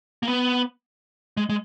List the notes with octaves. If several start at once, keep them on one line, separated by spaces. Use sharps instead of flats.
A#3
B3
G#3
G#3